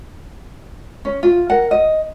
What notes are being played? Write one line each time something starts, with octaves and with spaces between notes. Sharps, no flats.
C#4
F4
A#4 F#5
D#5